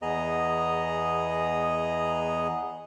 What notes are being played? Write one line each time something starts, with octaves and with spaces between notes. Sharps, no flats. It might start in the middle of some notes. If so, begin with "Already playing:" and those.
E2 B3 G#4 D#5 A#5